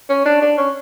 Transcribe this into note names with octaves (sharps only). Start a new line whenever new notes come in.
C#4
D4
D4
C#4